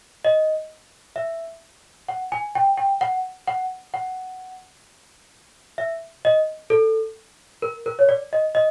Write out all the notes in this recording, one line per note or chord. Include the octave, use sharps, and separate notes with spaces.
D#5
E5
F#5
G#5
G5
G5
F#5
F#5
F#5
E5
D#5
A4
A#4
A#4
C#5
D5
D#5
D#5